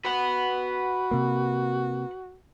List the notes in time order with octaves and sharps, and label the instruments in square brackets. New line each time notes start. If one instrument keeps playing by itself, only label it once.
[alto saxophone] F#4 [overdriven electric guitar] B4 F#5
[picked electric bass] C3 A#3